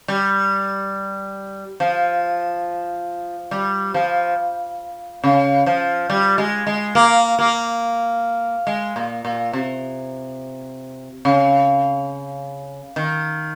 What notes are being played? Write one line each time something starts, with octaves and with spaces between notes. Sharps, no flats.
G3
F3
G3
F3
C#3
F3
G3
G#3
G#3
A#3
A#3
G#3
A#2
A#2
C3
C#3
D#3